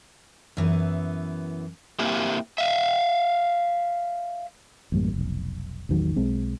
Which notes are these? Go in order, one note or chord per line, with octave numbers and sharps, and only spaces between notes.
F#2 E3 B3
A#3 C4 E4 G4
E5 F5
A1 F#2 G3 A#3
F1 B1
A1 E2 D#3 F#3
B1 G#3 C4